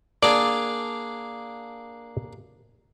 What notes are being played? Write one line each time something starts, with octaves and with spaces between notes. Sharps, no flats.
A#3 D4 G#4 D5